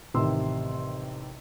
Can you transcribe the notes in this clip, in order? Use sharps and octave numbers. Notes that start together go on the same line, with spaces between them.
A1 C3 D#3 C6 E6